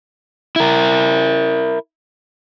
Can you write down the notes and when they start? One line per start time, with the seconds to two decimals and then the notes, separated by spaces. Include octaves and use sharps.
0.56 E4 A#4